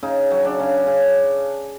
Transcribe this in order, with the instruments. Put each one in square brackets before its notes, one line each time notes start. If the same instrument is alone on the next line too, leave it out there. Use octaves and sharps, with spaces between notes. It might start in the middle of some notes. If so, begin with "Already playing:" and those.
[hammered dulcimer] C#3 D#4
F#3
D4
C#3
C#3